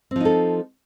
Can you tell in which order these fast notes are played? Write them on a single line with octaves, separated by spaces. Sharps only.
C4 F3 D#4 A4